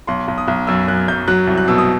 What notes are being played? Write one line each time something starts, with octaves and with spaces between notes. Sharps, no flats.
B1 C6
B1
D#6
B1
F#2 E6
F#2 F#6
F#2 G6
F#3 F#6
C2
F#6
B2 E6
D#6